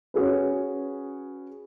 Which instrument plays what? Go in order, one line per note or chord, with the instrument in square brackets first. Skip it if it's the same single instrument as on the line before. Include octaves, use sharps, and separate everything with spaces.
[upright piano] C#4 F#4 G#4 B4